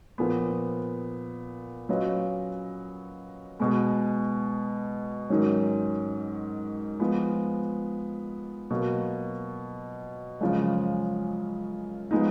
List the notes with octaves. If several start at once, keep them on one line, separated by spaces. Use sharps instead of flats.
A#2 F3 B3
F#3 C#4 F4 B4 D#5
B2 G#3 B3
G#2 D#3 F#3 C#4
F3 G#3 B3
B2 F#3 A#3
F#2 C#3 F3 G#3
F3 G#3 B3 D#4